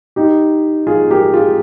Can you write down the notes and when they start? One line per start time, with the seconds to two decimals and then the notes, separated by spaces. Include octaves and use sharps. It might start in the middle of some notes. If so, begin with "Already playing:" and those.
0.16 D#4 G4
0.87 F4 G#4
1.11 G4 A#4
1.34 F4 G#4